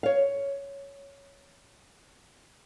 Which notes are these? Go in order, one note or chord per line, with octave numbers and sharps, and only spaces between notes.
C#5 F5